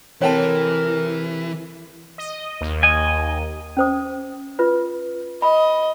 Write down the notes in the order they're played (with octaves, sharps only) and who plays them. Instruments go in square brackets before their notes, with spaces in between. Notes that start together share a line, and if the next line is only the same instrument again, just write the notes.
[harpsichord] C3 C4 A4 [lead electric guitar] E3 [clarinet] A#4 [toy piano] C#5 G5 A5
[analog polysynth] D#5
D#2
[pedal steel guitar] D#5 G#5
[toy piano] C#4 C5 D#6
F4 B4
[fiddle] D#5 [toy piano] B5